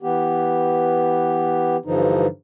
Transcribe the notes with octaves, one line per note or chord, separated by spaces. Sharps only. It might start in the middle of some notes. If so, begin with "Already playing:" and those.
E3 B3 G4
G2 D3 E3 F3 D#4